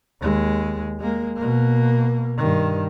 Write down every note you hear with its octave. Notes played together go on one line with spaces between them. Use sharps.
D#2 G#3
G#3 A#3
B2 A#3
G2 D#3